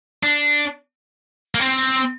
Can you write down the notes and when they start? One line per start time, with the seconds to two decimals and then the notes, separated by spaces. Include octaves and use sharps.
0.23 D4
1.55 A#3
1.60 C4